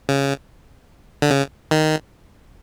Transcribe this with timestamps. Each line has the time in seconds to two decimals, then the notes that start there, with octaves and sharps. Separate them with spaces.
0.09 C#3
1.22 D3
1.30 C#3
1.71 D#3